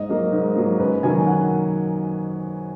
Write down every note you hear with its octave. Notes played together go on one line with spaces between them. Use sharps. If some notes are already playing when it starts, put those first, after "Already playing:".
Already playing: G#2 D#5
F#3 A#3
G#2
F#3 A#3
F#2 B4
D#3 F#3 A#3 G#5
F#5